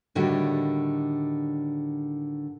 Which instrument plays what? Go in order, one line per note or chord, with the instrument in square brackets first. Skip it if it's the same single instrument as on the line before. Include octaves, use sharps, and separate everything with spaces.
[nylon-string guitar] A2 D3 D#3 G3 F#4